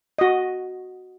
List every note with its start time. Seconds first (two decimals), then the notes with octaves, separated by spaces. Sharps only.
0.19 F#4 D#5